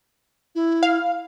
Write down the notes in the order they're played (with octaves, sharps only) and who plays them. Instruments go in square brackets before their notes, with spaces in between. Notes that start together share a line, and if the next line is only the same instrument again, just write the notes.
[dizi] E4
[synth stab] F5